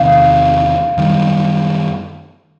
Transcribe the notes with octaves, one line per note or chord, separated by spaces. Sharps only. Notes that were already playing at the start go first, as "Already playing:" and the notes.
Already playing: E2 C3 D#3 F5
F#2 D#3 G3